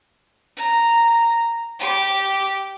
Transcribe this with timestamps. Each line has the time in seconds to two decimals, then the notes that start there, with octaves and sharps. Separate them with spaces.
0.57 A#5
1.79 G4 D6